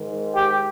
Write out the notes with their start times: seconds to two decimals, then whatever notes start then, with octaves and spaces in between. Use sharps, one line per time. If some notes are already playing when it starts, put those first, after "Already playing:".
Already playing: G#2 D#3
0.34 G4